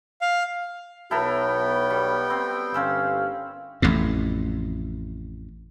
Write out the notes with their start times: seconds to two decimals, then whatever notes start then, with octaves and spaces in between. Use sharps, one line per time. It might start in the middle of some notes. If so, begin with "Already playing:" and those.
0.21 F5
1.11 B1 B3 E4 F#4 A4 A#4 C#5 G5
1.90 G3
2.30 C4
2.74 G1 C4 C#4 F5 E6
3.82 A1 F2 A2